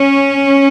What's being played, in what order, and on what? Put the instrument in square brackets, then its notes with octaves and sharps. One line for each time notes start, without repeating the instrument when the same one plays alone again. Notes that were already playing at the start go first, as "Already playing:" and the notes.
Already playing: [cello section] C#4